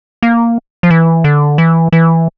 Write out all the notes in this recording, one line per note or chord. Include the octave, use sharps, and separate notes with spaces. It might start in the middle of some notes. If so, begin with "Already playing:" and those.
A#3
F3
E3
D3
E3
E3